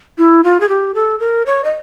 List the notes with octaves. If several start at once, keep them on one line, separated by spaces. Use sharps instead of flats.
E4
F4
G#4
G4
A4
A#4
C#5
D#5